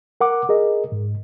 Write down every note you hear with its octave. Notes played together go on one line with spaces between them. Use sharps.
A#4 F#5 D6
G#4 A#4 D#5
G#2